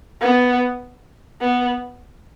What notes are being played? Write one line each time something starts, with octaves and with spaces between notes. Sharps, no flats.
B3
B3